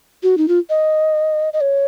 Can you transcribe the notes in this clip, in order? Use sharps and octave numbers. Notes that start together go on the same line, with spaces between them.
F#4
D#4
F4
D#5
D#5
C#5